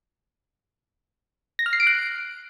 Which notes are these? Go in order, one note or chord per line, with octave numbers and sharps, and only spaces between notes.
A#6
F6
C7
D7
F#6